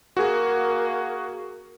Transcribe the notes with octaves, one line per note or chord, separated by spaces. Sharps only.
A#3 F#4 G#4